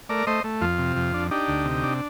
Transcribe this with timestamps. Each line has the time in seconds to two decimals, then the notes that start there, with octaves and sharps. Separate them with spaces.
0.09 A3 A#4 D5
0.27 A3 C5 D#5
0.44 A3
0.61 F2 F4
0.78 C3
0.96 F2
1.14 D4
1.31 D4 D#4 G4
1.48 D2
1.65 C3
1.83 D4